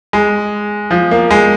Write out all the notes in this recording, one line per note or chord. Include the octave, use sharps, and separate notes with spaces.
G#3
F3
A#3
G#3